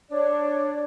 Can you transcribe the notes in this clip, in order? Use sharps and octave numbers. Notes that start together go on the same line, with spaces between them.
D4 C#5 D5